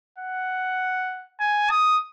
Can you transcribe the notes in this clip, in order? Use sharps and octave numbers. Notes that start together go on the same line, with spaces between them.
F#5
G#5
D#6